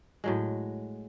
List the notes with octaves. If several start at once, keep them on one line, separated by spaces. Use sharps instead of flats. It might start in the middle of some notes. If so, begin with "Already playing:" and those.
A2 F#3 G#3